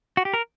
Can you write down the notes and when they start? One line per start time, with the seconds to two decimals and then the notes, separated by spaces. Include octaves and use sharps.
0.17 F#4
0.25 G4
0.34 A#4